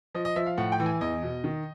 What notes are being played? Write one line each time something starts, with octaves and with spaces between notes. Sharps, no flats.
F3 D#5
D#5
F3 E5
F5
A2 F#5
G5
E3
G#5
E2 D#5
B2
D#3